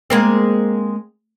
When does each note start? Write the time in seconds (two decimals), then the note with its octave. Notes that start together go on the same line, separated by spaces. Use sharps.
0.10 G#3 A#3 C4